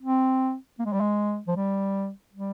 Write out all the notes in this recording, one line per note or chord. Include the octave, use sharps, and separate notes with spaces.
C4
A#3
G#3
G3
G#3
F3
G3
G3